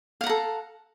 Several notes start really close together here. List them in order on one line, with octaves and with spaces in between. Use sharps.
F5 F#5 A#5 A4